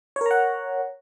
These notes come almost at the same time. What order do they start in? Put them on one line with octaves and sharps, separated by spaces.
C#5 A#4 A#5 F#5